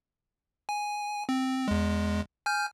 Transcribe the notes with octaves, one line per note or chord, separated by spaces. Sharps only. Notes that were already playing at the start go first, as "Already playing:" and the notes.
G#5
C4
E2 G#3
G#5 F6 G6